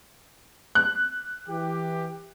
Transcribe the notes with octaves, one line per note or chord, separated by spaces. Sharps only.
F#6
E3 G4